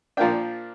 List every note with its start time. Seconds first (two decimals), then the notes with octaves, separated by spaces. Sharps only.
0.17 A#2 F3 A#3 D4 G5